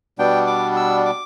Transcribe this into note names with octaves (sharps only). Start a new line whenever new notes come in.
B2 G3 B3 D4 G5
D6
E6
D6